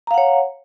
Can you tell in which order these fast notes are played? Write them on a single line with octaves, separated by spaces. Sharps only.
A#5 F5 F#5 C#5